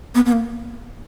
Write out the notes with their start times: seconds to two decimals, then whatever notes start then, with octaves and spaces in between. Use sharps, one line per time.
0.15 B3
0.26 B3
0.32 A#3